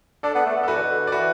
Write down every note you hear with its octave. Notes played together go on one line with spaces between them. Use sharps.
D4 A4 D5
B3
A3
B3
A4
E3 F#4 B4
D3
B2
D3
D5
E3 F#4 B4